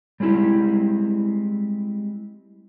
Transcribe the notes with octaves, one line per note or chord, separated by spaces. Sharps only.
G3 G#3 C4 E4 G4